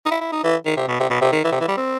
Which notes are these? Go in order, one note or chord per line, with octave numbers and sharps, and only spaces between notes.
D#4
E4
E4
D#4
E3
D#3
C3
B2
C3
B2
C3
D#3
E3
C3
E3
G3
C4